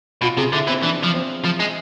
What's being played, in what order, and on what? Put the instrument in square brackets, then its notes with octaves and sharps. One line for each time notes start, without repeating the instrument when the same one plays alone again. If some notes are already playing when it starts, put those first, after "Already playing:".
[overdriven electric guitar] B2 [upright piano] F4
[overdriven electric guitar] C3 [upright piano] G#4
[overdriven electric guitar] D3 [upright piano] E4
[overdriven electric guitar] E3 [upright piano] C4
[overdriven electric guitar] E3 [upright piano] D4
[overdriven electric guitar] F3
[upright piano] C4
[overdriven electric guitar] F3
G#3